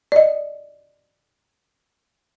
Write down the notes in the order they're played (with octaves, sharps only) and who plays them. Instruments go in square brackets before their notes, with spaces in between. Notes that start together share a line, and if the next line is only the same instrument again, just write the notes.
[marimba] D5 D#5